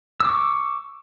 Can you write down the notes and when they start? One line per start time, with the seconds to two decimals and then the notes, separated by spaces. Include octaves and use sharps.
0.20 E6
0.25 D6
0.29 C#6